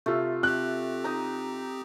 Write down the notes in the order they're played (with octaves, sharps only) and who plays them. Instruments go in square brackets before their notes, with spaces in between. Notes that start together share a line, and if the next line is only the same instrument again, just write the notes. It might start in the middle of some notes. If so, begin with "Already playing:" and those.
[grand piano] C3 F4 [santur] A3
[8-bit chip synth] C4 G4 [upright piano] F#6
[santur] D#4 A#5